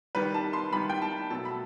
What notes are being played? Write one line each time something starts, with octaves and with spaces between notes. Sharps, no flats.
D#3 G3 B4
A5
C6
D#3 G3 B5
G5
A5
B2 F#3 A3 A5
B5